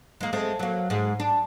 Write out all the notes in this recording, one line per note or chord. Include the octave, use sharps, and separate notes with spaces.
G#3 A#3
G#3 A3 C4
F#3 A#3
G#2 G#3
D4